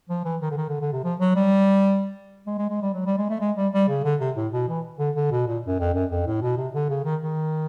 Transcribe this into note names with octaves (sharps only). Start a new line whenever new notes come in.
F3
E3
D#3
D3
D#3
D3
D3
C3
F3
F#3
G3
G#3
G#3
G#3
G3
F#3
G3
G#3
A3
G#3
G3
G3
C#3
D3
C3
A2
B2
E3
D3
D3
B2
A#2
F#2
F2
F#2
F2
A2
B2
C3
D3
C#3
D#3
D#3